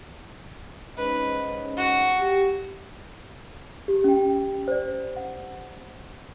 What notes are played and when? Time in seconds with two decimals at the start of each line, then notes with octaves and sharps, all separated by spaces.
0.97 G#2 C#4 B4 D#5
1.77 F#4
2.18 G4
3.88 G4
4.04 C#4 G5
4.68 C5 D5
5.17 F#5